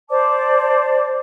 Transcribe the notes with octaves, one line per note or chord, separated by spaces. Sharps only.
C5 D5 A5 D6